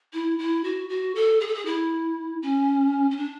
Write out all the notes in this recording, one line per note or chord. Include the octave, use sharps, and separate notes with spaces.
E4
E4
F#4
F#4
A4
G#4
A4
G#4
E4
C#4
C#4
D4